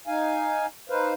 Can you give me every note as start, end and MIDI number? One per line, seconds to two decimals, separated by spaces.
0.07 0.66 63
0.07 0.66 77
0.07 0.66 80
0.90 1.14 63
0.90 1.14 71
0.90 1.14 72
0.90 1.14 77